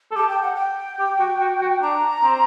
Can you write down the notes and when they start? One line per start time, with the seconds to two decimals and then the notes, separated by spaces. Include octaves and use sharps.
0.12 A4
0.16 G4 A5
0.29 G5
0.42 F#5
0.55 G5
1.00 G4
1.19 F#4
1.41 F#4
1.62 F#4
1.82 D4 A#5
2.24 C4